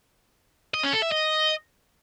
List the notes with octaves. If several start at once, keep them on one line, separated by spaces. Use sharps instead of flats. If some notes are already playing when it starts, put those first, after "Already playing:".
D#5
C#4
A4
E5
D#5